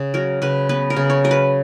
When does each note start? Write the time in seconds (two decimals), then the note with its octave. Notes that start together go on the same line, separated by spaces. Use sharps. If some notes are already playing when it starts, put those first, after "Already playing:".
Already playing: C#3
0.14 F#3 A#4
0.42 C#3 B4
0.69 B3 B4
0.90 A#4
0.96 C#3
1.10 C#5
1.24 F#3 A#4
1.31 B4